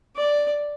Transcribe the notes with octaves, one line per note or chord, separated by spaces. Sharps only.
D5